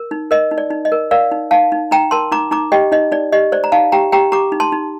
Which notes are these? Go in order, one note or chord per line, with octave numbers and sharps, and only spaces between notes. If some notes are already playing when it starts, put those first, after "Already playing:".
Already playing: A#4
D#4
A#4 D#5
D#4
D5
D#4
D#5
A#4
A#4 D5 F5
D#4
D#4 F5 A5
D#4
D#4 G5 A#5
A#4 A5 C6
D#4 A#5 D6
D#4 A#5 D6
G4 D#5 G5
D#4 D#5
D#4 D5
G4 D#5
C5 D5
A#5
D#4 F5 A5
G4 G5 A#5
G4 G5 A#5
G4 A#5 D6
D#4
A5 C6
D#4